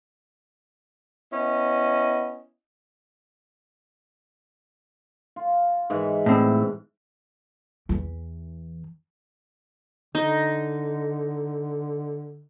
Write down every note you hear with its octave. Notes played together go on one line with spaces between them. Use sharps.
B3 C#4 E4 D#5
F4
G#2 E3
A2 C4
E2 E3
D3 D#4